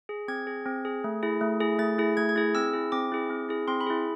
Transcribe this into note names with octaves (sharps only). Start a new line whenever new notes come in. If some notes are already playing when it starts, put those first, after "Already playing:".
G#4
C4 G#6
G#4
C4
G#4
A3
E4 G#4
A3
E4 G#4
A3 A6
E4 G#4
A3 G#6
G#6
E4 G#4
C4 E6
E4 G#4
C4 D6
E4 G#4
C4
E4 G#4
C4 C6
B5
E4 G#4